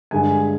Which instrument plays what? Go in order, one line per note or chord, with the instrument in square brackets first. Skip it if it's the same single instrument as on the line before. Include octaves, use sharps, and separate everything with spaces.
[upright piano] G2 D3 G#3 G#5